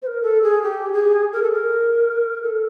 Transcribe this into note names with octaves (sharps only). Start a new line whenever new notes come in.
C5
A#4
A4
G#4
G4
G#4
A#4
A4
A#4
A4